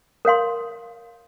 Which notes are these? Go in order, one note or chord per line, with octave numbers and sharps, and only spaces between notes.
A#4 C#5 F5 C6